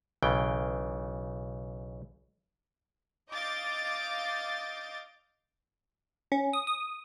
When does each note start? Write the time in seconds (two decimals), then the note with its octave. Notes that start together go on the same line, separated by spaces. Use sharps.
0.23 B1 C#3 E3 G5
3.31 D#5 F5 D6 G6 A6
6.32 C#4
6.53 D#6
6.67 D#6